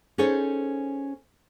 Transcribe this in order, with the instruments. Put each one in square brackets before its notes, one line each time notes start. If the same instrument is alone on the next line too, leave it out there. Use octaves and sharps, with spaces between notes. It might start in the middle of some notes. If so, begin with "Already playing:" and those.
[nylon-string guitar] C#4 D#4 G#4 A4 C5 C#5